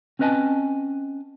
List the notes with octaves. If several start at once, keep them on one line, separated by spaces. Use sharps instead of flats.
C4 C#4 B4 D#5 G#5 A5